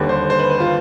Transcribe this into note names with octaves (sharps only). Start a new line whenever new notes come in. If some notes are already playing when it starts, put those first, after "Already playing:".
Already playing: D#2 D3 G3 B4
C5
C5
B4
B4
F4